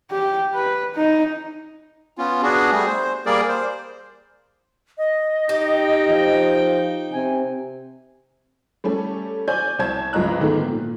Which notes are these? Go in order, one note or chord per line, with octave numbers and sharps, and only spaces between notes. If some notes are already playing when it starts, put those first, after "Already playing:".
G4
B4
D#4
B3 C#4 F4
B3 D4 F#4 G#4
G3 A3 G#4
C5
G3 A#3 G#4 A#4 D5
C5
D#5
D#4 G4 G5
F3
C3 G#5
G3 A3 C#4 A4
C#5 D5 G#5 G6
C2 C#5 A5 G#6
C#2 G2 F3 D#5 A#5 F#6
G#2 D3 D#3 G#3 A3 B3
A#2